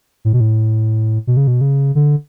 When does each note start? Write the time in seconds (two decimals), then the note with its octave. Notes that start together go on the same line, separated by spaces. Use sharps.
0.25 A2
0.33 B2
0.41 A2
1.27 B2
1.37 C#3
1.47 B2
1.61 C#3
1.95 D3